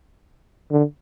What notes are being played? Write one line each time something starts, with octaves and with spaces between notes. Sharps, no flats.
D3